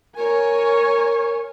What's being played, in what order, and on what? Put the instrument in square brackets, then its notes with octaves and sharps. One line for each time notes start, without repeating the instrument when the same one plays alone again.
[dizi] A#4 [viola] C#5 G#5